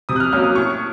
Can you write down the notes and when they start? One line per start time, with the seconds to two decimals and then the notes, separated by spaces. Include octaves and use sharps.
0.09 C3 D#6
0.16 F#6
0.20 F6
0.32 F#3 A#3 C#4 F6
0.44 D#6
0.55 A2 C#6